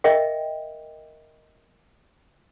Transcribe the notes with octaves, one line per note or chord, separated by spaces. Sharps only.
A#4 D#5 E5 G5